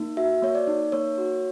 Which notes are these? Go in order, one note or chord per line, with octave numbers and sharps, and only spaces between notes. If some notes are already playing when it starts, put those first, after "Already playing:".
Already playing: A#3 D#4
F#4 E5
A#3 C#5
D5
D#4
A#3 C#5
F#4